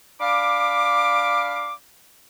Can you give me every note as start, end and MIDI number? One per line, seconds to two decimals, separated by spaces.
0.20 1.73 62
0.20 1.73 77
0.20 1.73 83
0.20 1.73 86